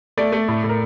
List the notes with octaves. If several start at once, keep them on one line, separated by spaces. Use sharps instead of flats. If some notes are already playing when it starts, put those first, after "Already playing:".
A3 D5
A3
A2
A2
A#4